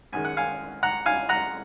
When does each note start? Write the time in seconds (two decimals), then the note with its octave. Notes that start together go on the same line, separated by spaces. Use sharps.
0.12 F#2 D#3 G#3 G#5
0.25 F#5
0.37 F5 G#5
0.83 F#5 A#5
1.06 F5 G#5
1.29 F#5 A#5